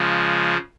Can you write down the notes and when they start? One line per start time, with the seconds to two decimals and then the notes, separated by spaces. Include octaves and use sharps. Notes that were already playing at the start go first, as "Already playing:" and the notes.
Already playing: C#3 F3 G#3